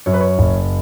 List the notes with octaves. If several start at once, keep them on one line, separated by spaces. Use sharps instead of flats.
F#2 C#5
B4
C#5
F#1